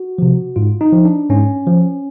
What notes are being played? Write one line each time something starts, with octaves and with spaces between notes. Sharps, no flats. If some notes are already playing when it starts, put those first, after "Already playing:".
Already playing: F#4
C3 F3
G#2 F4
D#4
F3
D4
G#2 C#4
F3